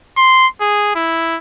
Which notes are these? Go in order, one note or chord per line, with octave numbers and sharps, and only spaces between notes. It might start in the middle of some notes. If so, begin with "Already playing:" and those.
C6
G#4
E4